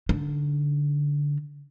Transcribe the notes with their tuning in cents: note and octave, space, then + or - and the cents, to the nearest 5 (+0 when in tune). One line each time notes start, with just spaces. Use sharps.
D3 -15 D#4 -20